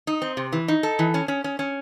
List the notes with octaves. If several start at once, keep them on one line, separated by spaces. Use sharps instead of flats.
D#4
C4
C3
E3
D#4
A4
E3
C#4
C#4
C#4
C#4